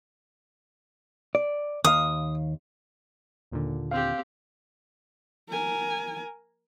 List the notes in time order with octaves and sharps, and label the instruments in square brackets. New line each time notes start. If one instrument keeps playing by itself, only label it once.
[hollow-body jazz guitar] D5
[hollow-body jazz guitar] D#2 F5 [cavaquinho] D#6
[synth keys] D#2 A#2 D3
[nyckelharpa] C4 G4 [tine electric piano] F5
[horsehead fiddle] A#4 G#5